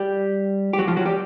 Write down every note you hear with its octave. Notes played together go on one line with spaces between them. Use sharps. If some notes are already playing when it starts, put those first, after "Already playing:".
Already playing: G3 G4
G4
F#3 F#4
F3 F4
F#3 F#4
G3 G4